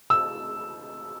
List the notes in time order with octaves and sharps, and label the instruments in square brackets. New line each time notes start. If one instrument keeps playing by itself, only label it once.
[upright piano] E6